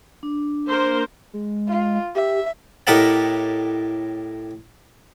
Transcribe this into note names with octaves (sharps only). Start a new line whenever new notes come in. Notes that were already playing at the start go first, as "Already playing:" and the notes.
D4
A#3 A#4 C5
G#3
F4
G4 E5
A2 G4 A#4 D#5 F#5 A5